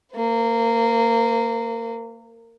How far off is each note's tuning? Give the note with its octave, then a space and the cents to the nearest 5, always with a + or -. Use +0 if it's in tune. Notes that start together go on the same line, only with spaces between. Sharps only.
A#3 -20 B4 +45